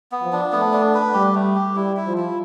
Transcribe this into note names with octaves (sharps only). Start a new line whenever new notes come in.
B3
F3
D4
A3 B3
D4
B4
G3 G4
A3
G4
G3 E4
E4
F3
E4